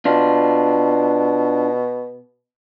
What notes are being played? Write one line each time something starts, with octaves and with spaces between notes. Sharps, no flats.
B2 D4 F4